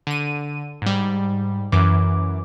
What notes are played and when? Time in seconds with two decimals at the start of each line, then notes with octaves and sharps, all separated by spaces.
0.07 D3 D#7
0.82 G#2 G3
1.72 F#2 E3 D6